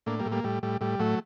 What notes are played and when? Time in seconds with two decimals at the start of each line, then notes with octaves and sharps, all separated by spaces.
0.06 A2 A#3 D4
0.19 G3 A#3
0.26 A2
0.32 G3 A#3
0.44 A2 G3
0.63 A2 G3
0.81 A2 G3
0.99 A2 F#3 A3